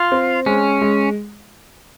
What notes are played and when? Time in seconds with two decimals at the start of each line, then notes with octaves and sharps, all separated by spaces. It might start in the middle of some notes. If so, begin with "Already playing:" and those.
Already playing: F4
0.12 C4
0.46 G#3 C#4
0.81 G#3